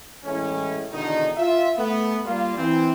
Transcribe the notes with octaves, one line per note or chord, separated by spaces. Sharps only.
A2 E3 G#3 C#4
E2 B2 D3 D#3 D#4
F4 E5
A3 B3
G3 A#3 F4
E3 C4